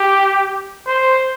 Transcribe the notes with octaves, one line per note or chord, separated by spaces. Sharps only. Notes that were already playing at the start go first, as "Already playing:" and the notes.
Already playing: G4
C5